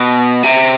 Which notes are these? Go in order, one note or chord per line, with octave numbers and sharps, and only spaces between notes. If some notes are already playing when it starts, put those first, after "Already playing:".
Already playing: B2
C3